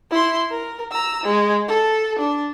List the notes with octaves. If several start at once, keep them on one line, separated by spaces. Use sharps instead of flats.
E4 C6
A#4
A#5 E6
G#3
A4
D4